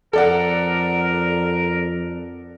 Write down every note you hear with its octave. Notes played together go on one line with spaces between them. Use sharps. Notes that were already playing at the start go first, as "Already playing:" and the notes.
F2 A4 A#4 D5 F#5